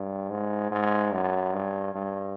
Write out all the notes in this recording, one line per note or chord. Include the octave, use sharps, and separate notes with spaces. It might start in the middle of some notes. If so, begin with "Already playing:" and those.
Already playing: G2
G#2
G#2
F#2
G2
G2